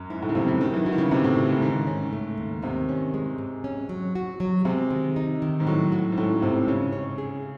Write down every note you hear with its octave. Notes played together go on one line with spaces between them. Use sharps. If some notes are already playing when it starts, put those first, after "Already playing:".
Already playing: F#2
G#2 E4
A2
C#3
C3 F#3
C#3
D#3 F#3
E3
E3 F#4
D#3
C#3
C3 C#4
A2
C#3
G#2
G#2 D#3
C#4
A3
D#2
C3 D#3
C#4
G#3
G#2
C#4
F#3
F#4
F#3
C3 G#3
D#3
D#4
D#3
G#2
A2 F#3
F#4
G#2
A2 C#4
G#2 C3
C#3 C#4
C#5
G#4